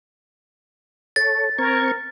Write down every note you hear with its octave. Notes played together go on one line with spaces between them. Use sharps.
A4 C#5 A6
C4 A#4 C#6 G#6